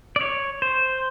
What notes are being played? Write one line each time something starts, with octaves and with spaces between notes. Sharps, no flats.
D5
C#5
C5